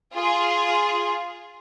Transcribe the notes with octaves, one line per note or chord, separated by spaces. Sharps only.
F4 G#4